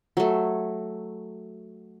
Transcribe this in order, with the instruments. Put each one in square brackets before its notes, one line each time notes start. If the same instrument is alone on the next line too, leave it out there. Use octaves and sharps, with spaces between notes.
[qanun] F#3 A3